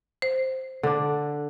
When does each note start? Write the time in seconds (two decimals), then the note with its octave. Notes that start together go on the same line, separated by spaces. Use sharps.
0.22 C5
0.83 D3 D4